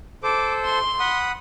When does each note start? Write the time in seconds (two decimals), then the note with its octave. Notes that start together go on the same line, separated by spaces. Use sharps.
0.23 A4 C5 D6
0.64 C6
1.00 F#5 B5 D#6